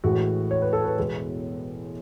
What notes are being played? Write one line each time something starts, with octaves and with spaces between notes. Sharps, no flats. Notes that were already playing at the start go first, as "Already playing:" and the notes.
A1 A2 E3 G#3 F#4
C#5
B4
A4
B4
E1 E2 B2 G#3